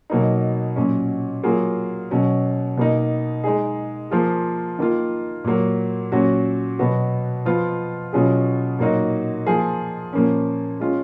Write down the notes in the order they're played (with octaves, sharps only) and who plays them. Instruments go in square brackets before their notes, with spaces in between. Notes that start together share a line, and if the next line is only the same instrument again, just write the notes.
[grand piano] B2 F#3 A#3 D#4
A#2 F#3 C#4
F#3 A#3 F4 G#4
B2 F#3 C#4
B2 A#3 D#4
G#3 D#4 G#4
F3 A#3 F4 G#4
D#3 A#3 F4
A#2 F#3 A#3
A#2 F#3 C#4 F#4
B2 F#3 B3 F#4
F3 B3 F4
B2 F#3 C#4 F4 G#4
A#2 F#3 A#3 D#4 F#4
F3 A#3 F4 G#4
A#2 F3 A#3 C#4
G#3 C#4 F4